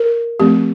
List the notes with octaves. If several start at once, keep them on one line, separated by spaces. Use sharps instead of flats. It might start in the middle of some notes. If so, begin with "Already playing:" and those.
Already playing: A#4
F3 A3 C4 G4